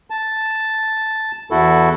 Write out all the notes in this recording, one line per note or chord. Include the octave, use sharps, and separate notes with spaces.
A5
E2 E4 F#4 A4